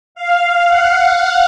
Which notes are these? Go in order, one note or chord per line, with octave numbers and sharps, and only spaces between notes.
F5
F#5